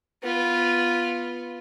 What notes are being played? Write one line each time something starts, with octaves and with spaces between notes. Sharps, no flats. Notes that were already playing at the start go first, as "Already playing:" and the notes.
B3 F4